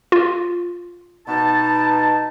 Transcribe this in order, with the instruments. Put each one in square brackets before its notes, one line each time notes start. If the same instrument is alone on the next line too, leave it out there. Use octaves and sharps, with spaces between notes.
[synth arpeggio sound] F4
[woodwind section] B2 D#4 A5